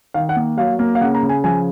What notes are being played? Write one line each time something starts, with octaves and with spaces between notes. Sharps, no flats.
D#3 F5
F#5
A#3
F#3 F5
A#3
F5
C#3 F#5
A#5
C#3
G#5
F3 G#5